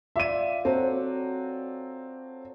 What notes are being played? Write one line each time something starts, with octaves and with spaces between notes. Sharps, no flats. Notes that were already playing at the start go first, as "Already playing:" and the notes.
F4 D5 E5 D#7
F#3 C4 A4 F#5